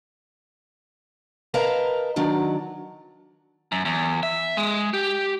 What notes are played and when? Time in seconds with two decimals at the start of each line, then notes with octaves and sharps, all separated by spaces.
1.54 A#4 B4 D#5 F5 A5 A#5
2.16 D#3 F#3 D4
3.72 F#2
3.85 E2
4.23 E5
4.57 G#3
4.94 G4